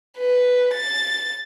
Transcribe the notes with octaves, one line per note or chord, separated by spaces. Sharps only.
B4
A6